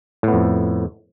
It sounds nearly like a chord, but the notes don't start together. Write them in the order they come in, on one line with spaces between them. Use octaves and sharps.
A2 B3 F2